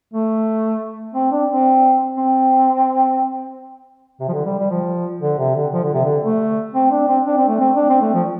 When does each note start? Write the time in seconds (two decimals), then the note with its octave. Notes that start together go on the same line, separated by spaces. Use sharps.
0.14 A3
1.15 C4
1.32 D4
1.49 C4
2.17 C4
4.20 C3
4.28 F3
4.33 D3
4.45 G3
4.58 G3
4.70 F3
5.22 D3
5.38 C3
5.55 D3
5.73 F3
5.83 D3
5.94 C3
6.05 D3
6.24 A3
6.74 C4
6.91 D4
7.08 C4
7.26 D4
7.37 C4
7.48 A3
7.60 C4
7.76 D4
7.89 C4
8.01 A3
8.14 F3